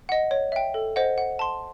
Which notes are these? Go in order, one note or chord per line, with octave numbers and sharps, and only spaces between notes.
D#5 F#5
C#5
E5 G5
A4
C5 D#5 F#5
F#5
A5 C6